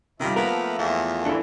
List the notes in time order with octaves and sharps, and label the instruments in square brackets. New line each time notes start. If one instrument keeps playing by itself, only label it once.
[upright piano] C3 G3 [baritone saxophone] D#3 [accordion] F3 A3
[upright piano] A#3 [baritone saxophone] B3 [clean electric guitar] A#4
[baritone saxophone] E2
[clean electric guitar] D3 E3 [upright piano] A4